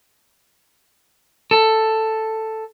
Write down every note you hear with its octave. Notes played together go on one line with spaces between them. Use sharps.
A4